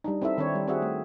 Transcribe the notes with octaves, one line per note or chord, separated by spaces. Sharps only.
G3 D4 D#4
C4 D#4 E4 A4 E5
D#3 C4 D4 D#4 C#5
G3
C4 F#4 G#4 E5 F#5
A3